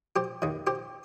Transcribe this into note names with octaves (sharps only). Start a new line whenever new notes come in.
G4 C5
D#2 D#3
G4 C5